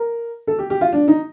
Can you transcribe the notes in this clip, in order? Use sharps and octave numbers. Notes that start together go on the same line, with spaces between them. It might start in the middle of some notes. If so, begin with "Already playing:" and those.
Already playing: A#4
A4
G4
G4
F4
D4
D#4